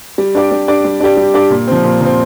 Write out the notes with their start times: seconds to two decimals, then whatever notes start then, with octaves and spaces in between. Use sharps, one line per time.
0.18 G3
0.35 D4 G4 D5
0.51 G3
0.68 D4 G4 D5
0.84 G3
1.00 D4 G4 D5
1.17 G3
1.34 D4 G4 D5
1.50 A#2
1.67 F3 C4
1.84 A#2
2.01 F3 C4